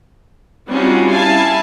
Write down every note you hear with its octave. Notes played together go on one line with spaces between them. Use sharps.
G3 C4 C#4 D#4 F4 F#4
E4 F5 G#5 A5